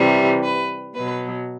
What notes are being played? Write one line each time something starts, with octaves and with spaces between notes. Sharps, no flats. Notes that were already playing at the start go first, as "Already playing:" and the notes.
Already playing: C3 E3 G3
B4
B2 F#3 B4